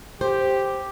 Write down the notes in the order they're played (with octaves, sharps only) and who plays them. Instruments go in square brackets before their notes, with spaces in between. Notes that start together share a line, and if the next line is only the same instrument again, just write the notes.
[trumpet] G4 [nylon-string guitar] C5